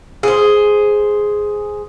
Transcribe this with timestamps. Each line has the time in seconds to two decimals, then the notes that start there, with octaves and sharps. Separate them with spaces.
0.23 G#4 C5